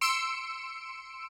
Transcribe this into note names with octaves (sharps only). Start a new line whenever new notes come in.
C6 E6 C#7 D7 E7